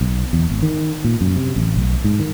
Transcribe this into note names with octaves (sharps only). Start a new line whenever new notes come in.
B1
E2
G#1
D#3
A#2
F#2
C3
A1
B1
G#2
D#3